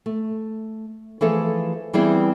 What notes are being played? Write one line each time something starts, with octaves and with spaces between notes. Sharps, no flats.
A3
E3 F3 A3 G#4 A4
E3 G3 B3 C4 E4 G#4